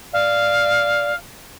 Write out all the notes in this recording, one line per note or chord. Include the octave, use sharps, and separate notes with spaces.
D5 F5